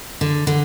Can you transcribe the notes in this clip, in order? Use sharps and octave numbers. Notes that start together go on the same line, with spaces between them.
D3
D3